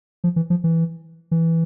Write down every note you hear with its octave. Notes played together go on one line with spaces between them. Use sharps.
F3
E3
F3
E3
E3